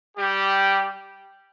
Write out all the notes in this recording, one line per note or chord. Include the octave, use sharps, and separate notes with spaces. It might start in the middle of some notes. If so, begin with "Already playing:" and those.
G3 G4